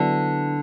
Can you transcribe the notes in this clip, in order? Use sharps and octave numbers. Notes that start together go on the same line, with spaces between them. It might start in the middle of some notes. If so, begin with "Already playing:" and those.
Already playing: D3 F#3 B3 E4 B4 D5